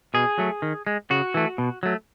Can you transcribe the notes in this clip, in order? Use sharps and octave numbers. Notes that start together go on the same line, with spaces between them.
B2 G#4
F#3 A3
D#3
G#3
C#3 F#4
E3 A3
B2
F#3 A3